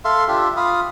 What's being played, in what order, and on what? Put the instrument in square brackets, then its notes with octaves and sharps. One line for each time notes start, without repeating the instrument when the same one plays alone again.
[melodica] A4 E5 F5 C6
D4 F4 G4 E5
F4 F5 B5 D#6